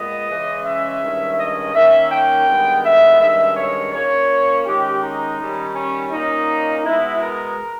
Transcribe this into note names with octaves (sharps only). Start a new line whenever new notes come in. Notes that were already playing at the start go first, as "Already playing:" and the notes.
Already playing: A#2 G#3 B3 D#5
C#3 E3 G#3 C#4
E5
G2 D#3 G#3 C#4
D#5
D#3 A#3 C#4 E5
G5
G2 D#3 G#3 B3
E5
G2 D#3 G#3 C#4 E5
C#5
A#2 A#3 C#4 C#5
D#3 G#3 C#4 G4
D#4
D#3 G3 C#4
C#4
A#2 A#3 C#4 D#4
B2 G#3 B3 E4
A#4